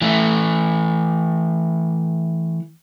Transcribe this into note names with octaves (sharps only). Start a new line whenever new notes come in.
E3 A3